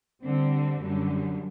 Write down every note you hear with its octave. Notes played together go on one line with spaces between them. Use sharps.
D3 G3 C4
F#2 D3 G3